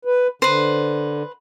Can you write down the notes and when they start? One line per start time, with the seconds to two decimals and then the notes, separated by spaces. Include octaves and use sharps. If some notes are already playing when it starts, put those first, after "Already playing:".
0.05 B4
0.42 D3 B4 C5